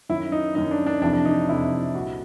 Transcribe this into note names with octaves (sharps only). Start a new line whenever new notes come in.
F#2 D#3 E4
D#4
F#2 D#3 D#4
D4
D4
F2 C3 E3 D4
D4
D#4
F2 C3 E3 E4
C2 A#2 F#4